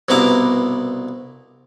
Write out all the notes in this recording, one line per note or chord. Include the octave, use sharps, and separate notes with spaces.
C2 G2 B2 E4 A#5 D6